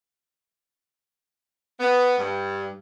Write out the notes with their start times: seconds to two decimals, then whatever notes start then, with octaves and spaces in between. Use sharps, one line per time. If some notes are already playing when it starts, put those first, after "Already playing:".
1.80 B3
2.18 G2